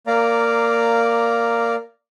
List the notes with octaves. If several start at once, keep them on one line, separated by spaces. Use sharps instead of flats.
A#3 D5 F5 A#5 D6